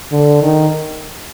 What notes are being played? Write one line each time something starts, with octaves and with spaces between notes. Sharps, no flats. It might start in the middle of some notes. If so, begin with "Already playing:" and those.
D3
D#3